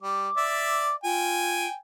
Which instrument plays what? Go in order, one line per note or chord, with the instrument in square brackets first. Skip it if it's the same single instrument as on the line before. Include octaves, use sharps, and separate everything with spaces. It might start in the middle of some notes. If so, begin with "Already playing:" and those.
[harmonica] G3 [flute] D6
[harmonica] D5 E5
[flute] F4 [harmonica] G5 G#5